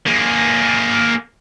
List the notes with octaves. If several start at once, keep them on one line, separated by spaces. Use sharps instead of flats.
A#3 G#4